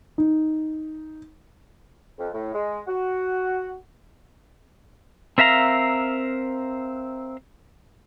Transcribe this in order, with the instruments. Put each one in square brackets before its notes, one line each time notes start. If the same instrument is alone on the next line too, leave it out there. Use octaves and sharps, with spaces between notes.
[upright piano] D#4
[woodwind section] F2
A2
G#3
F#4
[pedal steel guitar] C4 A#4 E5 F5 A#5